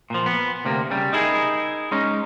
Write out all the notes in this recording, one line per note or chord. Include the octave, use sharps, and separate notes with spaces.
A#2 F3
B3
D2 C3 A#3
C#3 G3
D#4 E4 G#4 A#4
G#3 C#4 D#4